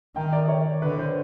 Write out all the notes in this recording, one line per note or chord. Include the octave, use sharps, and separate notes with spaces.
D#3 G5
D5
C#5
D3 B4
C5